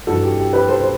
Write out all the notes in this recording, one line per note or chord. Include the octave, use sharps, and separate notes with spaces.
G2 E3 F#4 A4
G4
G4
G4 B4
A4 C5
C5